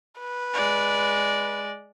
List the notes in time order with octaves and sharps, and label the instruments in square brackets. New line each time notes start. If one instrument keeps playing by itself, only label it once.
[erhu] B4
[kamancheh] G#3 D5